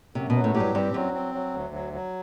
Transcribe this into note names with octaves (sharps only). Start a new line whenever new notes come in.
F#2 C3
B2 F#3
A2
A2 G4
G2
G2 C4
F#2 F#3
C4
F#3
D2
F#3
F#3